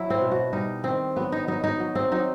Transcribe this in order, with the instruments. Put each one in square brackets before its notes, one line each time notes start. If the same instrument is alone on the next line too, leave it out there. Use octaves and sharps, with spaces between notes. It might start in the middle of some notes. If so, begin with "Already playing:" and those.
Already playing: [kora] F#3 E4
C4
B2
F#4
G3 D#4
D#3 C4
F#3 B3
D#4
F#3 D#4
D#4
F#3
C4
F#3 D#4